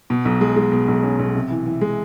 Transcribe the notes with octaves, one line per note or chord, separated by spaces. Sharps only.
B2
B1
G#3
G#3
B2
B1
C#4
B1
C3
E3
E3
G#3